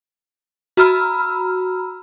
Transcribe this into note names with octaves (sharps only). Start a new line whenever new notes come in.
F#4 A#5 B5 E6 F6